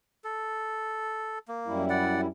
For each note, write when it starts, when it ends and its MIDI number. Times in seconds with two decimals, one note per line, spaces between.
0.24 1.39 69
1.48 1.85 58
1.67 2.27 42
1.67 2.27 55
1.67 2.27 64
1.90 2.21 74
1.90 2.21 78